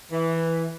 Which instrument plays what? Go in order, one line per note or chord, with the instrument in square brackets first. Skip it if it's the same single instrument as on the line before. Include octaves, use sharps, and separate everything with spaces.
[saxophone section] E3